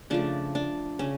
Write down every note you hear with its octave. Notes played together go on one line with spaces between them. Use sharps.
C#3 F3 A3 D4
D4
C#3 C#4